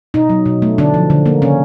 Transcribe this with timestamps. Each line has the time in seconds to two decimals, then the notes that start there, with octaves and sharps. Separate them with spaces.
0.14 B2 D#4
0.29 F#3
0.46 B2
0.62 A3
0.78 D3 D4
0.94 F3
1.10 D3
1.26 A#3
1.42 C#3 C#4